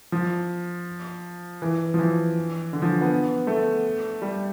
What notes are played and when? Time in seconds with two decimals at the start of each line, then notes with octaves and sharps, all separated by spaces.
0.12 F3
1.62 E3
1.94 F3
1.99 E3
2.73 D3
2.82 F3
3.01 B3
3.47 A3
4.22 G3